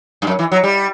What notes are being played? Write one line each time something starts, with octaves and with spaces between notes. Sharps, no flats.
G2
F#2
E3
F#3
G3